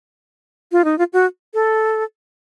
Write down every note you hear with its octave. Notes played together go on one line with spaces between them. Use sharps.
F4
D#4
F4
F#4
A4